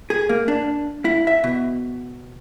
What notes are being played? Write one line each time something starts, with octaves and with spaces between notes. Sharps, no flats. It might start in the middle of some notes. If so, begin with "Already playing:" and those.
G#4
A#3
D4
E4
E5
B2